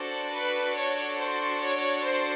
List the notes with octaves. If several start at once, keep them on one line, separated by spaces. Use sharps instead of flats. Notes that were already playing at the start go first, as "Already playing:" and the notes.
Already playing: D4 F#4 A4 C5
B4
C#5
C5
C#5
C5